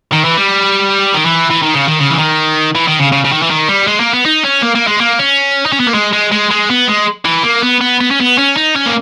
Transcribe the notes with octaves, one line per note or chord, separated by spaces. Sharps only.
D#3
E3
G3
D#3
E3
E3
D#3
C#3
D#3
C#3
E3
D#3
E3
D#3
C#3
C#3
C#3
D#3
E3
D#3
G3
G#3
A#3
B3
D#4
C#4
A#3
A#3
G#3
A#3
C#4
D#4
C#4
B3
A#3
G#3
G#3
G#3
G#3
B3
G#3
E3
A#3
B3
B3
B3
C#4
B3
C#4
D#4
C#4
A#3